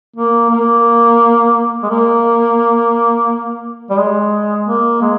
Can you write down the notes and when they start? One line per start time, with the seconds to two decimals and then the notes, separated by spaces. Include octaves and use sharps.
0.16 A#3
0.50 A#3
1.83 G#3
1.89 A#3
3.90 G3
3.98 G#3
4.66 A#3
5.01 G#3